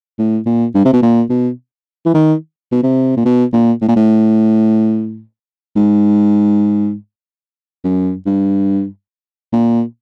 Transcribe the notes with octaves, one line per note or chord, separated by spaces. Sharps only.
A2
A#2
G2
C3
B2
A#2
B2
E3
D#3
B2
C3
A#2
B2
A#2
A2
A#2
A2
G#2
F#2
G2
A#2